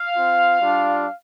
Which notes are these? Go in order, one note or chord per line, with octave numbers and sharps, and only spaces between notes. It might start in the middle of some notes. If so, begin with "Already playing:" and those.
Already playing: F5
C4 F4
G3 D4 F4